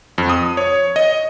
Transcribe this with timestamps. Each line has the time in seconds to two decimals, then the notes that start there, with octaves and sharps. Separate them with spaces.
0.18 F2
0.29 D#6
0.57 C#5
0.96 D#5